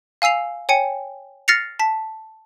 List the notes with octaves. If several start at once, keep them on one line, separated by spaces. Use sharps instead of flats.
F5 G#5 E6 C7 F7
C#5 G5 G#5 C#7
F6 A6 A#6 C7 C#7 F7
A5 B6